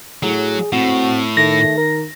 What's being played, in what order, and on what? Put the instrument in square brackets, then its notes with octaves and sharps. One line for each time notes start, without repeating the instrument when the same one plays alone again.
[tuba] A2 [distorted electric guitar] F#3 [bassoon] G#4
[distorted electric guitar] A2 [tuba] C4 [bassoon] F#4
[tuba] D#3 [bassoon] A3 [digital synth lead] A#6
[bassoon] A#4